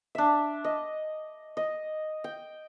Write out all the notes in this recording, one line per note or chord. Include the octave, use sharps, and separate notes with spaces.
D4 E5
D#5
D#5
G5